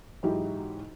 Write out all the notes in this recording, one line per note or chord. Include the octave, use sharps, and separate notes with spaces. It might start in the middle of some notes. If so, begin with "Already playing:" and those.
G#2 E3 F#3 D#4 E4 G4